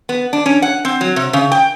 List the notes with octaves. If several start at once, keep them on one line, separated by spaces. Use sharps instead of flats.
B3
D4
C#4
F#5
C4
F#3
C3
C#3
G5